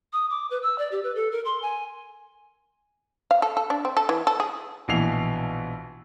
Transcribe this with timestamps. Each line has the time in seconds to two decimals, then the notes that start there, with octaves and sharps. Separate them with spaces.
0.13 D#6
0.30 D6
0.50 B4
0.63 E6
0.78 D5
0.92 G4
1.03 B4
1.15 A4
1.32 A#4
1.45 C6
1.62 G#5
3.31 F5
3.42 A4
3.57 A4
3.70 D4
3.85 C4
3.97 A4
4.09 E3
4.27 A4
4.40 G#4
4.88 A#1 B2 E3 C7 F7